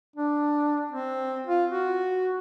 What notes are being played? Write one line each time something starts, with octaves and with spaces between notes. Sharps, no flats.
D4
C4
F4
F#4